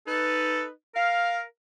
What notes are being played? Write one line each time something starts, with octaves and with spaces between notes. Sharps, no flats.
D#4 A4 B4
A#4 F5